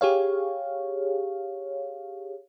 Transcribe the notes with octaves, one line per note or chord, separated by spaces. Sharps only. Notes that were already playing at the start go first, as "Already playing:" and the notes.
G4 G#4 C#5 F5